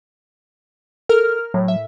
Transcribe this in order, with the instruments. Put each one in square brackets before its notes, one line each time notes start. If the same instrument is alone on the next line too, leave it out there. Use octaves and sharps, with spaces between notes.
[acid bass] A4 [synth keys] A#4 F6
[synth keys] A2 [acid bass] F#3
[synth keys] E5